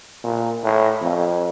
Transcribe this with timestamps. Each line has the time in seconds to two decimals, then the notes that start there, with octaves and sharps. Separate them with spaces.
0.24 A#2
0.63 A2
1.01 F2